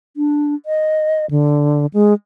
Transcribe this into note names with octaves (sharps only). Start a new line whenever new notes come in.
D4
D#5
D3
G#3